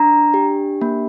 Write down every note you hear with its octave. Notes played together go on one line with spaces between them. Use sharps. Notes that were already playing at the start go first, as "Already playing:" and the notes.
Already playing: D4 A#5
G4
A#3